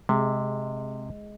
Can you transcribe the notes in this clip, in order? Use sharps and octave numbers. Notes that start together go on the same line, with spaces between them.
C3 G#3